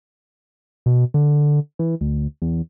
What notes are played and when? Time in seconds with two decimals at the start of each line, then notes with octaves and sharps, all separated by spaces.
0.86 B2
1.14 D3
1.79 E3
2.01 D2
2.42 E2